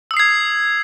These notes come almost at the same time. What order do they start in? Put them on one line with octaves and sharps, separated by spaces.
E6 D#6 C7 G#6